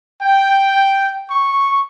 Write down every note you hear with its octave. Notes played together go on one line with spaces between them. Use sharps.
G5
C#6